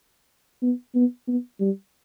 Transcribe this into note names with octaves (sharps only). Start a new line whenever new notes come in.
B3
B3
B3
G3